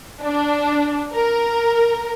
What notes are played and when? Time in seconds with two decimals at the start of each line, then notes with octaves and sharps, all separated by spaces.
0.22 D4
1.13 A#4